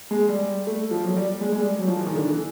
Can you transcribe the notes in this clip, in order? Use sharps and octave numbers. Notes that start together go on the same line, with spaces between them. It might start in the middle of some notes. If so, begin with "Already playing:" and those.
G#3
G3
A3
F3
F#3
G3
G#3
G#3
G3
F#3
F3
E3
D#3
D3
E3